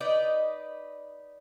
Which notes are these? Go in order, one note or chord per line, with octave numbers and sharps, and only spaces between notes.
D#4 B4 D5 D#5